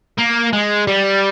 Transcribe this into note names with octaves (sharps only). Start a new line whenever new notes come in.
A#3
G#3
G3